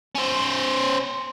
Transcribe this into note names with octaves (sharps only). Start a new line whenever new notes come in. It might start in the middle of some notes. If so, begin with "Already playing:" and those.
C#4 C5